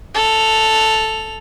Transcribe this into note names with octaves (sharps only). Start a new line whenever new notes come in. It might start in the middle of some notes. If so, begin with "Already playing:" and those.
A4 F7